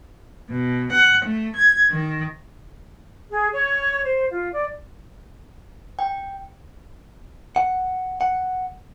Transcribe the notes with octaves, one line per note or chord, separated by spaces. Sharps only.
B2
F#5
A3
G#6
D#3
G#4
C#5
C5
F4
D5
G5
F#5
F#5